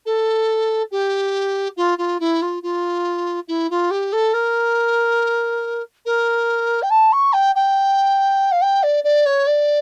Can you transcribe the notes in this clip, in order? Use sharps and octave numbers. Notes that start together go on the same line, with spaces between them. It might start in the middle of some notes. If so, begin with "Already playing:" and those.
A4
G4
F4
F4
E4
F4
F4
E4
F4
G4
A4
A#4
A#4
G5
A5
C#6
G5
G5
F5
G5
D5
D5
C#5
D5